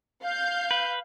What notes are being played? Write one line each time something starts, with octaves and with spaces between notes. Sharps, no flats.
F5 G6
B4